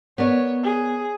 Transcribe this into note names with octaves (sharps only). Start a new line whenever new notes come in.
B3 A#4 C#5 D5
G#4